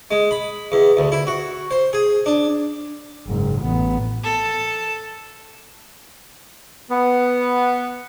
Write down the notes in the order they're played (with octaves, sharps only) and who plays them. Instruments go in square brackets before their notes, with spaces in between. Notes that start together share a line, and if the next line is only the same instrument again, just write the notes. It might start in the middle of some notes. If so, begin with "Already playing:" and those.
[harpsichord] G#3
B5
E2
D2
E4
F#4
C5
G#4
D4
[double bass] F#1 G#2
A1 B3
[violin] A4
[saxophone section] B3